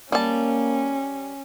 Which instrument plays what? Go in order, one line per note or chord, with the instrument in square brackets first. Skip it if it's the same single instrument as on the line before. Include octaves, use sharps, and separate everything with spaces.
[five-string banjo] G3 A5 [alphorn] A#3 [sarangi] C#4